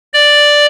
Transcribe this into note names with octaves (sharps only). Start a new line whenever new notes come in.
D5